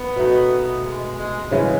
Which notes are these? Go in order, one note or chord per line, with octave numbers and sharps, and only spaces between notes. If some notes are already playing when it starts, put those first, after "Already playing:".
Already playing: B3
B2 A3 D#4
G#3
G#3
C#3 E3 G#3 C#4